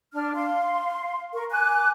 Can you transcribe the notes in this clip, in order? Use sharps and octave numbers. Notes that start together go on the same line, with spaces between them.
D4 F6
F5 C6
A#4 C#6
G#5 D6 F#6